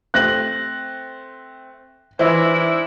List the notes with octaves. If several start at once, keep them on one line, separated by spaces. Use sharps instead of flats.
A3 C4 F#6 A#6 F#7
G#2 E3 D4 E4 C5 E5